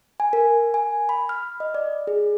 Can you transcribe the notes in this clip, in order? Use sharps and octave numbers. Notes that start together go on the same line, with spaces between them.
G#5
A#4
G#5
B5
F6
D#5
D5
G#4